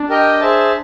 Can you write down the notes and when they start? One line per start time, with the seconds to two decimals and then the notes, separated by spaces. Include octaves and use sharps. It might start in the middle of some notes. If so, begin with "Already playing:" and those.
Already playing: D4
0.09 G4 A#4 D#5 G5
0.41 G#4 C5 E5 A5